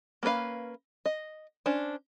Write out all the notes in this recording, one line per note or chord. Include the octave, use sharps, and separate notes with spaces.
A#3 C#4 A#4 B4 F5
D#5
C#4 D4 C5